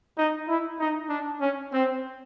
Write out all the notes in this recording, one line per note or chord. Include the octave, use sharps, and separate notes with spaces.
D#4
E4
D#4
D4
C#4
C4